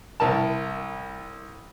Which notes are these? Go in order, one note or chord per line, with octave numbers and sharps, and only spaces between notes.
C2 E4 A#4 A5